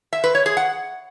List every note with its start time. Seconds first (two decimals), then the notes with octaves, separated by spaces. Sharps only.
0.13 E5
0.24 B4
0.35 C#5
0.46 G#4
0.57 F#5